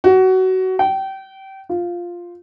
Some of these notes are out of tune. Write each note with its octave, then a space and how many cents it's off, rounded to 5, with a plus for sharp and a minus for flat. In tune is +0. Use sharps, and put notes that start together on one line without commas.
F#4 +20
G5 -25
F4 +0